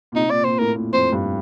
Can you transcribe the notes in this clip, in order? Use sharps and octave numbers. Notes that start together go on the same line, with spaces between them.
A#2
C3 D#4
A#2 D5
A#2 C5
A2 A#4
A#2
F2 C5
G2